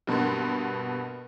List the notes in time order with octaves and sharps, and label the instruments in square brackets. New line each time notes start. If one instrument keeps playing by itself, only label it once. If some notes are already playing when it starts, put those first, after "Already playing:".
[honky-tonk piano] G2 B2 A#3 B3 C6